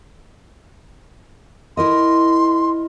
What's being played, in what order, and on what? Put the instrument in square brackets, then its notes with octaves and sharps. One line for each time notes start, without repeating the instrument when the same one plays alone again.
[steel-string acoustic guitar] E4 A#4 D#5 [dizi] C6